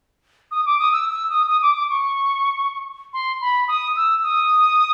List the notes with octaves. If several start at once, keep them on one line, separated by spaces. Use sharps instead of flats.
D#6
D6
D#6
E6
E6
D#6
D#6
D6
D6
C#6
C6
B5
D#6
E6
D#6